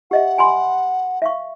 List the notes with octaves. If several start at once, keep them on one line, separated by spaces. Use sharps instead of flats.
G4 D#5 E5 F#5
G#5 B5 C6
E5 F5 C#6